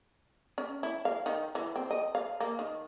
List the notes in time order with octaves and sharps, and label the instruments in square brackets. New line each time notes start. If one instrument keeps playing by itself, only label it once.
[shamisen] C#4
E4
F5
D#3
E3
C4
D#5
F5
A#3
D#3